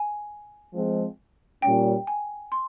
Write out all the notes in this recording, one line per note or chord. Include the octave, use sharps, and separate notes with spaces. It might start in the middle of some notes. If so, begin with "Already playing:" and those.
Already playing: G#5
F3 G#3 C4
A#2 G3 C#4 G5
G#5
C6